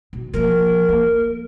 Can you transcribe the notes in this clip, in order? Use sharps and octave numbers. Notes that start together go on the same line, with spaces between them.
B2
F3 A#3 A#4
A#3